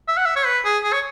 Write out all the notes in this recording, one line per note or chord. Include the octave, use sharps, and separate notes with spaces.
E5
F#5
E5
C#5
B4
G#4
G#4
C#5